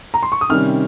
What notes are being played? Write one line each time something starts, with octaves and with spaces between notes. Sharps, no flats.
A#5
C6
C#6
D#6
C3 D#3 G3 C#4 F6